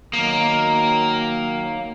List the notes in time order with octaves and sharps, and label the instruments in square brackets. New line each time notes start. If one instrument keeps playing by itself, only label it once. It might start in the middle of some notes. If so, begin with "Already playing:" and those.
[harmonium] D#3 F#3 [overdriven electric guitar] A#3